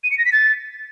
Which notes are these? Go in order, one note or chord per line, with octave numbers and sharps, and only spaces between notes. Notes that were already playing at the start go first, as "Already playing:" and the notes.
D#7
C#7
A#6
B6
A6